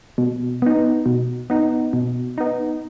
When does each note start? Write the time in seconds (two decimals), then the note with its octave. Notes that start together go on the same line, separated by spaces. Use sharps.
0.18 B2
0.62 B3 D#4
1.06 B2
1.50 B3 D#4
1.93 B2
2.38 B3 D#4